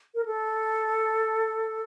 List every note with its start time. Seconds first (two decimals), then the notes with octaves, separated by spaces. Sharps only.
0.15 A#4
0.25 A4